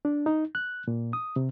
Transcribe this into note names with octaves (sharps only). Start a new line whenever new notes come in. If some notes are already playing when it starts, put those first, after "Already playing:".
D4
D#4
F#6
A#2
D#6
C3